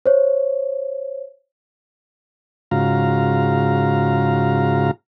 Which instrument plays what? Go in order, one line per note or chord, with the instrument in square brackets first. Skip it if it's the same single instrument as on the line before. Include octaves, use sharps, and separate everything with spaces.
[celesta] C5 C#5
[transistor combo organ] G#2 C#3 F4 F#4 F5 A#5